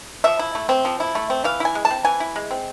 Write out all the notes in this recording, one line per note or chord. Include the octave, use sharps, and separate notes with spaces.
F3 E5
E4
A3
C4
F3
E4
A3
C4
E3 F5
E4 G#5
G#3
A5
C4
E3 G#5
E4
G#3
C4